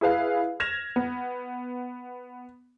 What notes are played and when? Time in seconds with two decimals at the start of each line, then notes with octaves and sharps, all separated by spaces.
0.01 E4 G#4 B4 F5
0.60 F6 G#6 A#6 E7 F7
0.96 B3